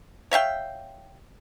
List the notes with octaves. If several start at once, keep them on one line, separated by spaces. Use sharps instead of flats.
C#5 E5 F5 G5